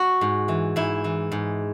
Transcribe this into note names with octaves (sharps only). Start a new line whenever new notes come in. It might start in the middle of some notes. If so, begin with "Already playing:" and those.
Already playing: F#4
G#2
E3
G#2 E4
E3
G#2